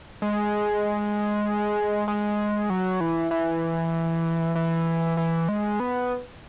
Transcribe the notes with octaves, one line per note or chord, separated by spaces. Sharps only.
G#3
G#3
F#3
E3
E3
E3
E3
G#3
B3